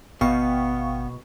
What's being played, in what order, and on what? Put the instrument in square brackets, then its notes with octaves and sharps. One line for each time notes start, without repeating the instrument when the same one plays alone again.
[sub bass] G#1 [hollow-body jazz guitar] B2 [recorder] B3 [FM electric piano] F5 G5 C#6